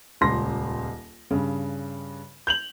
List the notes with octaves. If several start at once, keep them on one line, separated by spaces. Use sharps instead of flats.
D#1 C#2 C6 A#6
G2 C#3
G6 F7 F#7